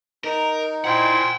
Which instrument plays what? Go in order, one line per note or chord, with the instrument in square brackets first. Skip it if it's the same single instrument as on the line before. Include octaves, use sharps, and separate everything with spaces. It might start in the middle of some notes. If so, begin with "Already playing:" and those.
[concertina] D#4 [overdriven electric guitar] A#4
[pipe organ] A#2 E4 [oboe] C5 [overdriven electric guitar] F#5 G5